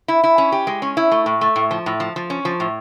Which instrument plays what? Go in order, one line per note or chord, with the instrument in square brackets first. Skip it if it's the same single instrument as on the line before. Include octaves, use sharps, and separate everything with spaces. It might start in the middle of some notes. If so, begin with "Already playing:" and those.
[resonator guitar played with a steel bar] E4
E4
C#4
G4
G#3
C#4
E4
A3
A2
A3
A2
F3
A2
F3
F3
C#4
F3
A2